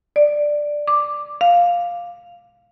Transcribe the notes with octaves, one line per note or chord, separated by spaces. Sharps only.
D5
D6
F5